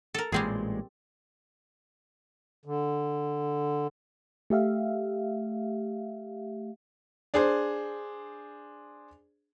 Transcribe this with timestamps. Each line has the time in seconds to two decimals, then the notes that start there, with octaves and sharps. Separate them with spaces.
0.14 A4 A#4
0.32 A1 A#2 G3 G#3 C4 G#4
2.65 D3
4.50 A3 G4 E5 F5
7.34 D4 G#4 C5